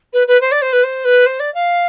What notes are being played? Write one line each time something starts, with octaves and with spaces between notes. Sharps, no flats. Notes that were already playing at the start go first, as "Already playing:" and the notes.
B4
B4
C5
D5
C5
B4
C5
B4
C5
D5
F5